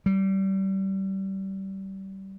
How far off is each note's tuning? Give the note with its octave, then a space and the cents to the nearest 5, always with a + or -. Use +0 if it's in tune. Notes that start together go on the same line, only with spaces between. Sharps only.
G3 -25